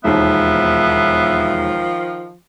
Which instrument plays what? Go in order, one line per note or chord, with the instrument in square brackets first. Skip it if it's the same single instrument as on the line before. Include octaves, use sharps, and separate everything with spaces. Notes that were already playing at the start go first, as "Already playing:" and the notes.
[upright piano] E1 D#2 [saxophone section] D#3 F3 [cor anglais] B3 [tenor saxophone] E5